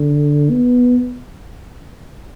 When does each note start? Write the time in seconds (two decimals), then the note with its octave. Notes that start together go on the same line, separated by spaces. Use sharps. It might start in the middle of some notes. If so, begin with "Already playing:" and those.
Already playing: D3
0.50 B3